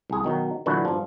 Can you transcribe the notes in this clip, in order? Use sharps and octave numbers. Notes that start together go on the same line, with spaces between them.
C2 G#4
B2 D#3 F#3
A#2 D3 E3 F#3 B4 C#5
G2 F3